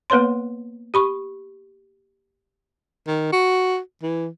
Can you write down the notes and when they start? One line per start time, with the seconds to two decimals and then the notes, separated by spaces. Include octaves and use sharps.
0.10 A#3 B3 B4 C#5 C6
0.94 G4 B5 C#6
3.07 D#3
3.32 F#4
4.03 E3